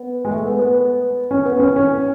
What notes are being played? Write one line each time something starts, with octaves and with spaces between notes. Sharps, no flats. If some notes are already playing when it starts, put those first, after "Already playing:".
Already playing: B3
G#3
A3
B3
B3
C#4
B3
C#4
C#4